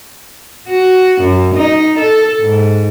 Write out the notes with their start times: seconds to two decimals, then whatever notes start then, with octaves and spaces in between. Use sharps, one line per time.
0.69 F#4
1.21 F#2
1.54 D#4
1.98 A4
2.41 G#2